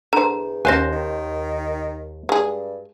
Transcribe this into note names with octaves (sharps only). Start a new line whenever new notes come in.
E2 D3 C5 A#5
D#2 C#4 C5 F5 G#5 F#6 A#6
D#3
G2 G#3 G#4